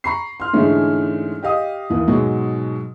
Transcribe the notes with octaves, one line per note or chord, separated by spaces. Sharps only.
A#5 B5 C#6 C7
C6 F6
G#2 D3 E3 G#3 A3 C#4
G4 D#5 F5 D#6
D#2 E3
G#2 B2 F#3 G#3